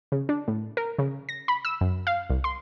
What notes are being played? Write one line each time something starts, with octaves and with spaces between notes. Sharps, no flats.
C#3
D4
A2
A#4
C#3
A#6
B5
E6
F#2
F5
C2
C6